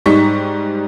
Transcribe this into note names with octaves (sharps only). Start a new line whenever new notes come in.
G#2 G3 D#4 C#6 B6